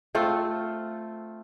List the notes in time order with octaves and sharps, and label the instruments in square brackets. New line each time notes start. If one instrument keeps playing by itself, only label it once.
[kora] A3 C4 F4 A4